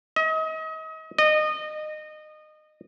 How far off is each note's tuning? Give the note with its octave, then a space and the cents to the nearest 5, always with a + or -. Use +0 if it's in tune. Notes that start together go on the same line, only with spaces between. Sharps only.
D#5 +35
D#5 -25